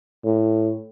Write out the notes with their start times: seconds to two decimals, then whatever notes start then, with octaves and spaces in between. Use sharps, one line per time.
0.24 A2